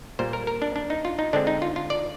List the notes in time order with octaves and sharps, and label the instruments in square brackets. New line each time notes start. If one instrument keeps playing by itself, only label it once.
[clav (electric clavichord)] A#2 G3 A#3 C5
A#4
A#4
D4
D4
D#4
F4
D#4
D3 G#3 C4 D4
D#4
F4
F4
D5